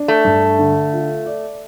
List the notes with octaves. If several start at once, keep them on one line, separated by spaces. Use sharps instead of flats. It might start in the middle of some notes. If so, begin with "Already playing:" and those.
Already playing: D4
A3
G2
D3
F4
D5